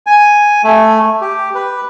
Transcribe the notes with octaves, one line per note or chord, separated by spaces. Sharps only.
G#5
A3
G4
B4